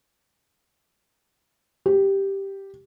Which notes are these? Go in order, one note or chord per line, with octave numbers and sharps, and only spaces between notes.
G4